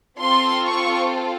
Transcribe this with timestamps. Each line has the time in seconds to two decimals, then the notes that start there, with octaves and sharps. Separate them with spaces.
0.20 C4 F4 A4 C6
0.66 C#6